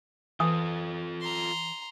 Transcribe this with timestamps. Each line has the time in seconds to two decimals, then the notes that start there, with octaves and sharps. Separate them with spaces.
0.40 E3 F4 A4 D#6
1.21 A#5 C6